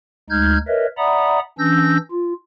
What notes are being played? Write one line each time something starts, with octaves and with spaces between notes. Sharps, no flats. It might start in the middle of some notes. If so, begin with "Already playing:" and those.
D2 G#3 D#4 F6 G6 G#6
A#4 B4 C#5 D#5 E5
D5 E5 F#5 A#5 B5 D#6
E3 C#4 D4 E6 G6 A#6
F4